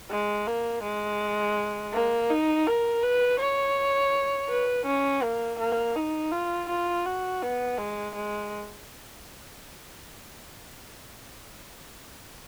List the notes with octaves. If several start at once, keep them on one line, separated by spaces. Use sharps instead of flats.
G#3
A#3
G#3
A#3
D#4
A#4
B4
C#5
B4
C#4
A#3
A#3
D#4
F4
F4
F#4
B3
G#3
G#3